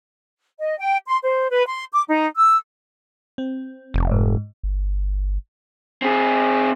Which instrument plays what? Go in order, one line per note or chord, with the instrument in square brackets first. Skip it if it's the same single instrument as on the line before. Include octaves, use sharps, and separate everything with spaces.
[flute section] D#5
G5
C6
C5
B4
C6
D6
D#4
E6
[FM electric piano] C4
[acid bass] F1
[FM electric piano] G#2
[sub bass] G1
[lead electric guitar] C4 G#4